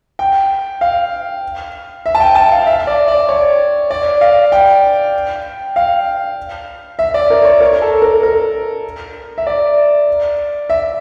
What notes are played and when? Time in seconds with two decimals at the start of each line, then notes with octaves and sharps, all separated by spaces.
0.19 G5
0.81 F5
2.06 E5
2.15 A5
2.20 G5
2.35 A5
2.52 F5
2.67 E5
2.87 D5
3.08 D5
3.29 C#5
3.91 D5
4.21 F5
4.52 G5
5.76 F5
6.99 E5
7.14 D5
7.30 A#4
7.45 C#5
7.60 A#4
7.82 A4
8.02 A#4
8.23 A#4
9.38 E5
9.47 D5
10.70 E5